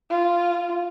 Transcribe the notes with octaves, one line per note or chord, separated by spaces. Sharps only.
F4